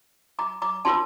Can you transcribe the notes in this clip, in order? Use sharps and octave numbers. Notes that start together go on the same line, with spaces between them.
A#5 D6
A#5 D6
D4 F4 A#4 A5 C6